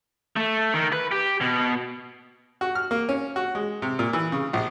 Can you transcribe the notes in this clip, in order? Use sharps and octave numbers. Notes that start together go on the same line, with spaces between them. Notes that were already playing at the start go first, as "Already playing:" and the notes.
A3
D#3
B4
G4
B2
F#4
F6
A#3
C#4
F#4
G#3
C3
A#2
E3
C#3
A#1